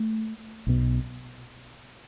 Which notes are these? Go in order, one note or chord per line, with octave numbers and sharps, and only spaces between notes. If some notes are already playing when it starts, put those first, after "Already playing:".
Already playing: A3
B1 B2